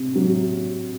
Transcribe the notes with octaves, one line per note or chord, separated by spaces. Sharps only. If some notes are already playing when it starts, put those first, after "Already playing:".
Already playing: C3
F#3